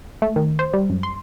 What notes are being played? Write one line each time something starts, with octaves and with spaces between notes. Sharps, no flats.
A3
D#3
C5
G3
F#2
C6